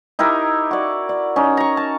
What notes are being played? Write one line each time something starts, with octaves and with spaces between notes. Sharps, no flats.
D#4 E4 G4 A#4
F#4 D5
D5
C#4 D#4
A#5 C#6
A5